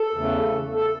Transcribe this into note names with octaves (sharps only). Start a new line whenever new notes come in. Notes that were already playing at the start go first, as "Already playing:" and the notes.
Already playing: A4
E2 C#3 E3 A3
A4